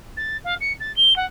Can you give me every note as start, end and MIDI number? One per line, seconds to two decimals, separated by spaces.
0.17 0.37 93
0.45 0.55 77
0.61 0.73 97
0.80 0.94 93
0.96 1.16 103
1.16 1.26 78